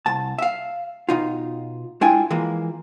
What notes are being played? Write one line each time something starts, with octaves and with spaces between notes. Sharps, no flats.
C2 A5
E5 F5
B2 D#4 F4
G#3 D4 E4 F4 G5 G#5
E3 F3 G#3 A#3